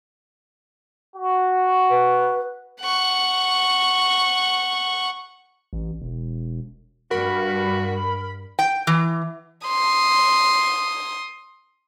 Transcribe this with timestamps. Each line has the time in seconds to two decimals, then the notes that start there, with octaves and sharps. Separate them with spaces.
1.16 F#4
1.90 B4
2.81 F#5 C#6
5.73 A1
6.02 E1
7.11 G2 F#4 A#4 B5
8.59 G5
8.87 E3
9.67 C6 D#6